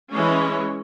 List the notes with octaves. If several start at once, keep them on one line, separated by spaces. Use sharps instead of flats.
E3 G#3 C#4